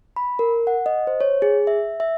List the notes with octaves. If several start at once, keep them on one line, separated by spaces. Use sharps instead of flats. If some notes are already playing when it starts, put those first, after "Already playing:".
B5
A#4
F#5
D#5
C5
C#5
G#4
E5
E5